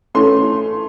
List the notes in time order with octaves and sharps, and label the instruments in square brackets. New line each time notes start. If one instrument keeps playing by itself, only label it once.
[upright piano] E3 A3 C#4 C6